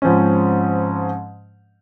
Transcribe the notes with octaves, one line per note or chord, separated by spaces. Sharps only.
G#2 F3 C4 C#4